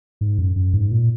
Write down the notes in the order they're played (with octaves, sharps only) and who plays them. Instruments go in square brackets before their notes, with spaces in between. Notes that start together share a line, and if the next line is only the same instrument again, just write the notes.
[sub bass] G#2
F#2
F#2
G#2
A#2